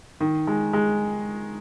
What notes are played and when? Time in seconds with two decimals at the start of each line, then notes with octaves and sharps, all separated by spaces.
0.21 D#3
0.47 G#3
0.73 G#3